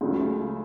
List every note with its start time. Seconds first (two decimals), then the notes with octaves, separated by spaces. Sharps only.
0.01 C#2 C#3 F#3 A3